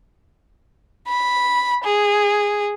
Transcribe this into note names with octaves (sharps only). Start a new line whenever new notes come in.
B5
G#4